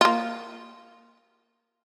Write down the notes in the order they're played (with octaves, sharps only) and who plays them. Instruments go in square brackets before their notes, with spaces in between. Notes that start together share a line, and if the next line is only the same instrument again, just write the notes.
[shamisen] A#3 F4